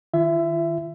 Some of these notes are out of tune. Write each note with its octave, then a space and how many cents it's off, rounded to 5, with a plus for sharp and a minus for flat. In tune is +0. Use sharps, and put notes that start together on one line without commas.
D#3 +0 F4 -45 E5 +15